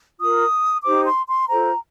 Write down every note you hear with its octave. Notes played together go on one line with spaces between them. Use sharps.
F4 A#4 D#6
D#4 G4 C5 D6
C6
C6
F4 A4 C5 A#5